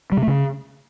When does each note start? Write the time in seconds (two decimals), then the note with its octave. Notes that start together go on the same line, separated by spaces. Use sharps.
0.12 G3
0.17 C3
0.22 A3
0.28 C#3